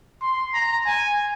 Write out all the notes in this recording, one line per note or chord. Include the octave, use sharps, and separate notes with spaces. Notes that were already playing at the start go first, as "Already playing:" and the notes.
C6
A#5
G#5